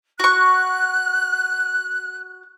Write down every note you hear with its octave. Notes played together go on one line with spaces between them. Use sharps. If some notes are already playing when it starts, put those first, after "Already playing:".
F#4 C#6 F#6